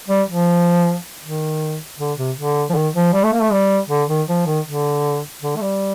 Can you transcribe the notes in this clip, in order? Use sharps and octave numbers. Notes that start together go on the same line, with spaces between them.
G3
F3
D#3
D3
C3
D3
F3
D#3
F3
G3
A3
A#3
A3
G3
D3
D#3
F3
D#3
D3
D3
A3
G3